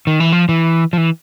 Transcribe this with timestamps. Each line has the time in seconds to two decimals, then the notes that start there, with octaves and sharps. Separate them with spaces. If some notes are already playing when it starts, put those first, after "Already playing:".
0.07 D#3
0.20 E3
0.32 F3
0.49 E3
0.93 F3
0.98 E3